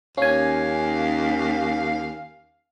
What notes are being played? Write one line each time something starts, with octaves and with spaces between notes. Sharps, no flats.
D#2 C#4 F5 G#5